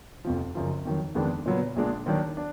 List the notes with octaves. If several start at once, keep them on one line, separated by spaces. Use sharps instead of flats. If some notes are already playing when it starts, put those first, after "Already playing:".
F1 F2 F3
F#1 F#2 F3
F2 D#3 F#3
F2 D#3 G#3 B3 D4
A#2 F#3 B3
A#1 A#2 G#3 D4
D#2 D#3 F#3 D4
D4